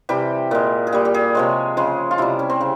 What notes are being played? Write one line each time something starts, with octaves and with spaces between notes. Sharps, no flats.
C3 E3 G3 G4
A#2 G#3
G#4
A#2 G3 G4
G4
G#4
C3 F3 G#3 C#5
C#3 F3 G#3
F4
C3 G3 E4
C#4
C4
C#3